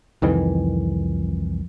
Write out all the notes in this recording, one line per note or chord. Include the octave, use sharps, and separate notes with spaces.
C2 F2 D#3 E3